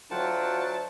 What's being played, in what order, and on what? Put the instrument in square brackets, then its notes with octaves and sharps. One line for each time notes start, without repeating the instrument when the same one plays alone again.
[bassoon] D2 [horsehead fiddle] F#3 [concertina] F4 F#5 G5 [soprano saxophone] A5